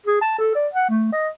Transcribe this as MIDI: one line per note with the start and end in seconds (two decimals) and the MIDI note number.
0.06 0.19 68
0.22 0.35 81
0.38 0.54 69
0.55 0.68 74
0.73 0.88 78
0.90 1.09 57
1.13 1.29 75